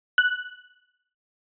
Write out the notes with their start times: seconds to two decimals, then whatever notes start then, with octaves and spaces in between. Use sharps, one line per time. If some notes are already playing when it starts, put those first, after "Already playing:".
0.18 F#6